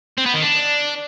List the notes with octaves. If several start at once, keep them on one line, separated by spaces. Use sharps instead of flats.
C4
B3
D#3
D4